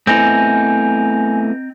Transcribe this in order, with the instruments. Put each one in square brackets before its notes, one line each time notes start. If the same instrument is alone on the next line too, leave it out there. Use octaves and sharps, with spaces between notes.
[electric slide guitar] A3 B3 E4 [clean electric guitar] C4 D#4 [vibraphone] G#5